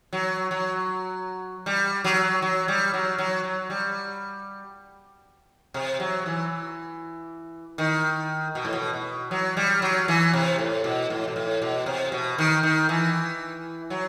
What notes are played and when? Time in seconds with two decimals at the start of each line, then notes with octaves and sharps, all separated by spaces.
0.13 F#3
0.51 F#3
1.66 G3
2.04 F#3
2.42 F#3
2.68 G3
2.94 F#3
3.19 F#3
3.44 F#3
3.70 G3
5.74 C3
6.00 F#3
6.26 E3
7.78 D#3
8.55 B2
8.65 A2
8.73 B2
8.93 B2
9.31 F#3
9.57 G3
9.82 F#3
10.08 E3
10.33 C3
10.59 A2
10.84 B2
11.10 A2
11.28 B2
11.36 A2
11.62 B2
11.86 C3
12.12 B2
12.38 D#3
12.63 D#3
12.89 E3
13.90 F#3